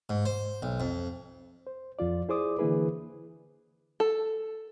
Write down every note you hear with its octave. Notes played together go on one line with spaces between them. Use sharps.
G#2
C5
B1
F2
C5
F2 F3 F4 D5
E4 G#4 C5 D5 D6 D#6
D3 E3 A#3 E4 G#4 B4
A4